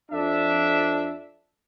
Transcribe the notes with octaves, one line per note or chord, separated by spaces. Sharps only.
F2 D4 E5